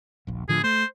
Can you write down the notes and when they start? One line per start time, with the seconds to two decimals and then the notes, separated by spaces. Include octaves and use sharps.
0.27 D#1 A#1
0.49 A2 D3 F3 G#4
0.64 A3 C5